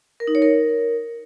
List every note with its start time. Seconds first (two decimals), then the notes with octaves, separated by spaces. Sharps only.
0.20 A#4
0.27 D#4
0.35 C#5
0.42 A#4